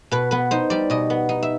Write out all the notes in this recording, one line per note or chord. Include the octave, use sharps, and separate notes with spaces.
B2 B4
B3 B4
D#4 C5
G3 D5
B2 D#5
B3
D#4
E5